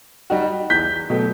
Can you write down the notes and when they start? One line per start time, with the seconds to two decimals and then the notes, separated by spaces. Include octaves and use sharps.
0.30 G3 D#4 F#4
0.70 E2 G6 B6
1.10 B2 F#3 A3